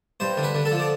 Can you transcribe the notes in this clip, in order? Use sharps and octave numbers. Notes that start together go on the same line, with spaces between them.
G2 C5
D3
B4
D3
A4
F3
D5